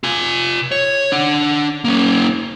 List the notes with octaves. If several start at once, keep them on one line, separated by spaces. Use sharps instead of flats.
F4 G#5
C#5
D4 F#5
A#3 C#4